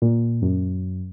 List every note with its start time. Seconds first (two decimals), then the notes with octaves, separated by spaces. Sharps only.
0.02 A#2
0.42 F#2